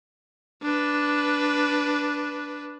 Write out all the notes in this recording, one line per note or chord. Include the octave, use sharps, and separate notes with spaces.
D4 B4